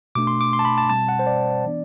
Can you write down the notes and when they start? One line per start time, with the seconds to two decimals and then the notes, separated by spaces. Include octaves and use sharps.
0.15 B2 A3 D4 D6
0.27 C6
0.41 D6
0.53 C6
0.59 A5
0.65 B5
0.78 A5
0.89 B2 G3 C4 A5
1.09 F#5
1.19 C5
1.27 D5
1.65 E3 B3 D4